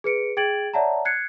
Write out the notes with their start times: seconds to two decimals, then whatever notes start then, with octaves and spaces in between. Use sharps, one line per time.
0.04 G#4 B4 C#7 D7
0.37 G#4 G5 G#6 A6 D7 F#7
0.73 C#5 D5 E5 F#5 A5 A#5
1.05 F#6 G#6 C7 C#7